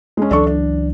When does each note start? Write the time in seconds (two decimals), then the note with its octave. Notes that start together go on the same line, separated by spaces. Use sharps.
0.17 G#3 C#4
0.31 C#2 E3 F#3 D4 A4 C#6
0.47 D4